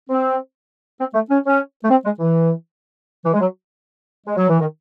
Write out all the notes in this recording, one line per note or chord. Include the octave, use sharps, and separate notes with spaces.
C4
C4
A3
C#4
C#4
A3
C4
G#3
E3
E3
G#3
F#3
G#3
F#3
E3
D#3